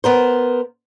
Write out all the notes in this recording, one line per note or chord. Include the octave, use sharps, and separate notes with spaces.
B3 A#4 C5